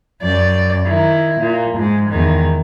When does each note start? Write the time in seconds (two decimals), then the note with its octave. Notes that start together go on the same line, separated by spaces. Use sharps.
0.21 F#2 D5
0.86 D#3 E4
1.40 A#2
1.78 G#2 G#3
2.10 E2 D#3